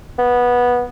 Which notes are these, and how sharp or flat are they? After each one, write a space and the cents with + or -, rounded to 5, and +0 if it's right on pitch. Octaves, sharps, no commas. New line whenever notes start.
B3 -15